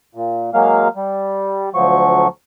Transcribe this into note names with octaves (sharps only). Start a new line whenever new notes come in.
A#2
F#3 G#3 A#3 F5
G3
D2 F3 F#3 C#6